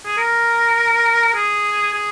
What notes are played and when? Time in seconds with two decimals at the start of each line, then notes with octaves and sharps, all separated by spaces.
0.06 G#4
0.17 A#4
1.34 G#4
1.94 G#4